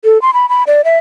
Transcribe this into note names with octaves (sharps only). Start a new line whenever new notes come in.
A4
C6
B5
B5
D5
E5